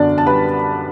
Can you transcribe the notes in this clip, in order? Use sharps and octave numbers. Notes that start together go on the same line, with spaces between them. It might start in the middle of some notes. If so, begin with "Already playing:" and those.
Already playing: F#2 D3 B3 D4 D5
A5
G3 B4 B5